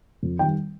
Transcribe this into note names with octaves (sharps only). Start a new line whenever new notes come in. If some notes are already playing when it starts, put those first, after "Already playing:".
F2
D#3 G3 G5